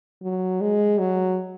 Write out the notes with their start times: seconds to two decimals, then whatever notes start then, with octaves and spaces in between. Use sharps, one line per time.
0.23 F#3
0.61 G#3
0.99 F#3